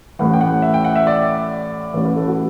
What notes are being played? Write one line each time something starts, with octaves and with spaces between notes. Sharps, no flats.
A1 A2 E3 F#5
G5
F#5
E5
G5
F#5
E5
D5
A1 A2 E3 C#5
B4
A4
F#4